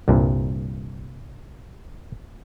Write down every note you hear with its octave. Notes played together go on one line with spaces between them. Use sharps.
C2 G2 A#2